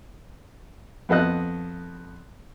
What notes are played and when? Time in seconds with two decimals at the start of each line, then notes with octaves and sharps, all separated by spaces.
1.09 F2 B3 A4 D#5 F#6